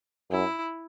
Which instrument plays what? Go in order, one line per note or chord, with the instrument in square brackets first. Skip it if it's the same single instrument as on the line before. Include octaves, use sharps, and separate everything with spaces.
[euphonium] F#2 [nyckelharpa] E4